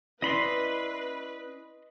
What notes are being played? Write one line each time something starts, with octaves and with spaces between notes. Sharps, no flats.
C#4 E4 B4 D5 D#5 B5 C6